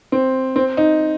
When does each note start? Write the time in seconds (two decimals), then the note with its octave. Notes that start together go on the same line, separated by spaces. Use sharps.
0.12 C4
0.56 C4
0.77 D#4